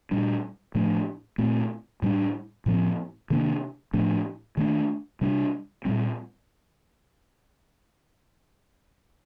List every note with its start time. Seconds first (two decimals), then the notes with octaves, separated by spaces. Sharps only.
0.11 A#2 G3 D4
0.75 A2 F3 A3 D4
1.38 A#2 A3 C4
2.02 A2 G3 D4
2.66 A2 F3 C4
3.30 C3 D#3 A#3 D4
3.94 A2 F3 A3 D4
4.57 D#3 A3 D4
5.21 C3 G3 D4
5.85 A#2 G3 C4